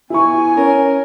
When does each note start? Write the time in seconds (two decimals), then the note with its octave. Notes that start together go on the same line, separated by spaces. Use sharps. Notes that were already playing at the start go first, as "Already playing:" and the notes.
0.10 B3 E4 G#5 C#6
0.57 C#4 A#4